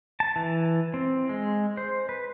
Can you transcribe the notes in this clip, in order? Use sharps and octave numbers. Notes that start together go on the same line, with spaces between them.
A5
E3
C4
G#3
C5
B4